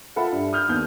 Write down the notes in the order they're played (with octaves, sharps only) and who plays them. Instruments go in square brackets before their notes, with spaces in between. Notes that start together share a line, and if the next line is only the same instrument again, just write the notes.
[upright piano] F4 A4 E5 F#5 B5
G2
D#6 F6 G6
D#2 B3 G6